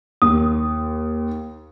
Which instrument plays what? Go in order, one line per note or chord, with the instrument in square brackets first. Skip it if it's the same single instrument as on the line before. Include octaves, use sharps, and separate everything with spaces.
[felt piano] D#2 [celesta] D#6